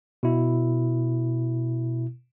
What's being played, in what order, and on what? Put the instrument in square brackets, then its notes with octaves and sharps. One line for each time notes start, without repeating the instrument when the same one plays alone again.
[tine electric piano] B2 E4